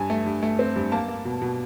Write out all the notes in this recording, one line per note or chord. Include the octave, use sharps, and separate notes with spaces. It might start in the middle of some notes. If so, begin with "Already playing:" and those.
Already playing: G2 G#5
A3
G2
A3
C4
G2
A#3 A5
A#3
B2
B2